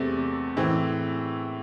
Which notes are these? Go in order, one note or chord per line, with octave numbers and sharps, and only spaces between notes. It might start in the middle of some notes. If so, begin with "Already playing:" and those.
Already playing: E2 C3 A3 C4
A2 E3 C4